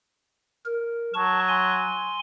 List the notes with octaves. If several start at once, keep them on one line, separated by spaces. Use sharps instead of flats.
A#4
F#3 A5 C#6
G#5 C6